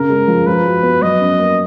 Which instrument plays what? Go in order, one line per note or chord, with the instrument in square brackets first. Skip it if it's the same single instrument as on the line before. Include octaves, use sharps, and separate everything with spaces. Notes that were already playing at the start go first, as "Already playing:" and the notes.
Already playing: [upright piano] C#3 [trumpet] A#4
[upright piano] G#3
F3
[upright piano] F3 [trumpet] B4
[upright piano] F#4
B3
[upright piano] F#3 [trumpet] D#5
[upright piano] C#4
A#3